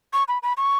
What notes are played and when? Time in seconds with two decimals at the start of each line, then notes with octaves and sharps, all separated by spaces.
0.13 C#6
0.28 B5
0.43 B5
0.57 C#6